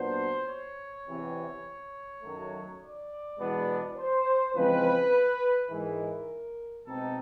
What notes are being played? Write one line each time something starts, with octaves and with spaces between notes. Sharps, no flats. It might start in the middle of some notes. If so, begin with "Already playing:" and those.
Already playing: A#2 F#3 B3 D4 C5
C#5
E2 C3 E3
F#2 D#3 F#3 A3
D5
E2 B2 G#3 B3 D4
C5
E2 C#3 F3 G#3 C4 B4
G#2 E3 G#3 A#4
B2 G#3 C4 D#4 A4